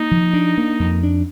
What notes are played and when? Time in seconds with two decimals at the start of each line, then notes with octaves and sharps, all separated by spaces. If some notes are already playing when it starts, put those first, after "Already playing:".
Already playing: A#3 D#4
0.11 F3
0.33 D4
0.57 A#3
0.80 F2
1.03 D4